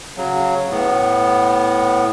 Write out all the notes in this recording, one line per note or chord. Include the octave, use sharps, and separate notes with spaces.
C#3 F#3
A2 B3